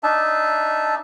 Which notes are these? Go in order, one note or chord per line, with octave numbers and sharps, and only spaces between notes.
D4 D#4 E5 A5